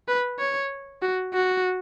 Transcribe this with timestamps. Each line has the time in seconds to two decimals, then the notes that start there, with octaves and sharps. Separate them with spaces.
0.08 B4
0.39 C#5
1.02 F#4
1.33 F#4